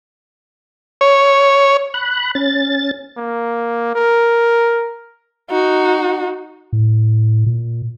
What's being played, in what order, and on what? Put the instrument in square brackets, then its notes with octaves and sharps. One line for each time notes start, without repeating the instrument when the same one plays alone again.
[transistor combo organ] C#5
[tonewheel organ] B5 F#6
C#4 A6
[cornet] A#3
A#4
[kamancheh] D#4 F#4
[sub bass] A2
A#2